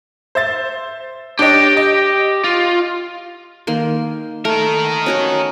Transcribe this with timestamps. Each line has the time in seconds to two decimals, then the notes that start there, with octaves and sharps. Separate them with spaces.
0.35 C5 E5 A6
1.39 D4 G4 C#5 D#5 G5
1.77 D#5
2.44 F4
3.67 D#3 A#3 C6
4.45 A3 D#4 A#4
5.06 C#4 F#4 C#5